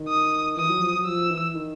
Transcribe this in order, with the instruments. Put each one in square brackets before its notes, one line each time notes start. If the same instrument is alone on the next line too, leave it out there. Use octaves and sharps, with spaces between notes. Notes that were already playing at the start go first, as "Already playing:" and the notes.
Already playing: [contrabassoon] D#3
[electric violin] D#6
[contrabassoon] E3 [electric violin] D#6
[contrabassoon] F#3
F3
F#3
[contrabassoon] F3 [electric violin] E6
[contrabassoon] E3
D#3